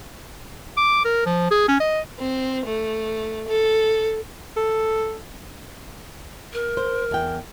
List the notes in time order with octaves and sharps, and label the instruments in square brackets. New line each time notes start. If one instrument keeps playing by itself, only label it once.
[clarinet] D6
A#4
F3
G#4
C#4
D#5
[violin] C4
A3
A4
[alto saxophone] A4
[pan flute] A#4
[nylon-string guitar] C5
E2 G5